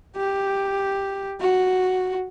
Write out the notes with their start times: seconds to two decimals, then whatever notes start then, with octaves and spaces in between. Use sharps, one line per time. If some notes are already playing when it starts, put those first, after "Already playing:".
0.16 G4
1.40 F#4